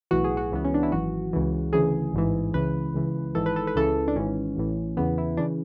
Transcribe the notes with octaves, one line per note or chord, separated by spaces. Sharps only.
B1 A2 E3 F#4
G#4
F#4
C#2 C#3 E3 B3
C#4
D4
E4
G#1 F#2 E3 F#4
C#2 C#3 E3
D2 C#3 E3 G#4
A1 G#2 E3
C#2 C#3 E3 B4
C#2 C#3 E3
G#1 G#2 E3 A4
B4
A4
B4
C#2 C#3 E3 A4
D4
G#1 G#2 E3 C#4
A1 A2 E3
E2 C#3 E3 B3
E4
C#3 E3 D4